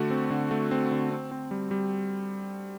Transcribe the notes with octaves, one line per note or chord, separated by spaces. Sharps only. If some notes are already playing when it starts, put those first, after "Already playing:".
Already playing: D3 A3 F#4
C4
D3
A3
C4
D3
C4
C4
G3
G3